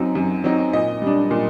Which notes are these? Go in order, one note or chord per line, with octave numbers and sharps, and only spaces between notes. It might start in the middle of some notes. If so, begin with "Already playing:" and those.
Already playing: F#2 F#3 C4 D#4
F#2
F#3 C4 D#4
A#2 D#5
G3 D4
A#2